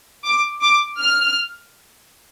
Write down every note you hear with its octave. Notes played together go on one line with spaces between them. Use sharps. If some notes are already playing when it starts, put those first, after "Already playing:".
D6
D6
F6